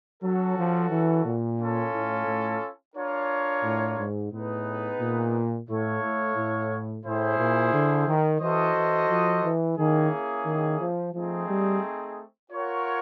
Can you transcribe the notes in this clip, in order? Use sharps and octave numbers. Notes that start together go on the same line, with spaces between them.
F#3 C#4 F#4 A4
F3
E3
A#2
C#4 F4 A4
A2
A2
D4 F4 A#4 C#5
A2
G#2
A2 B3 D#4 G#4 B4
A#2
A2 E4 A4 C#5 F5
A2
A2
A2 E4 G#4 C5
A#2
D3
D#3
E3 F#4 A4 C5 D#5
E3
F3
E3
D#3 A#3 C#4 E4 G#4
D#3
F3
F3 A3 C4 D#4 G#4
G3
F4 A#4 C#5 F#5